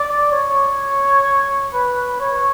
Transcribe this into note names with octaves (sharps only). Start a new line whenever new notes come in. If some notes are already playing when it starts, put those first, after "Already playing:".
Already playing: D5
C#5
B4
C#5